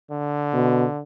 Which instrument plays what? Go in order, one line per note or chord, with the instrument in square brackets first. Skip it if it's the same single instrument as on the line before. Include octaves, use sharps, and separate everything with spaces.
[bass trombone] D3
[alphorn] B2